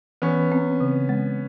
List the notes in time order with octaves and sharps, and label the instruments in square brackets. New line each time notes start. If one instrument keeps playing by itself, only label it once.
[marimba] E3 [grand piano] B3 C#4
[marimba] C4
C#3
G#3